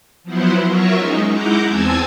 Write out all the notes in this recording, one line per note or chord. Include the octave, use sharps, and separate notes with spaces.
F3 F#3 B3 E4 C5 F#5
F#3 F4 A#4 C#5 E5 C#6
G#3 C#4 D#4
G#3 E4 F#5 A#5 D6 G6
E2 C4 G#5 A5 E6 G#6